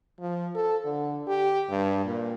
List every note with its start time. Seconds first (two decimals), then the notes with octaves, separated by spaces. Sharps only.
0.20 F3
0.55 A4
0.85 D3
1.27 G4
1.70 G2
2.05 A#2